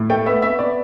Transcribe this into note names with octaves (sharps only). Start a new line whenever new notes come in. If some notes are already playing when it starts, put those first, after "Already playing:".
Already playing: A2
A3 G5
B3 E5
B3 E5
B3 D5